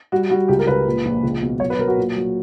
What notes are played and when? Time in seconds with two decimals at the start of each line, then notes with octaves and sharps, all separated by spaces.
0.12 G3 F#4
0.30 G3 F#4
0.48 C#2 G4
0.59 A#4
0.67 C#2 B4
0.87 A#2
1.05 A#1
1.23 C#2
1.42 B2
1.60 F#3 C#5
1.70 B4
1.79 F#3 A#4
1.88 F#4
1.97 A#2
2.16 F#3